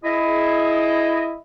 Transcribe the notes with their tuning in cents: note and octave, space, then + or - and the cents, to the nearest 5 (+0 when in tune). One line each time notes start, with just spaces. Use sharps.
E4 +5 G#4 +20 D#5 +0